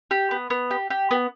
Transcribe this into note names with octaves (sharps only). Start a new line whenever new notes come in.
G4
B3
B3
G4
G4
B3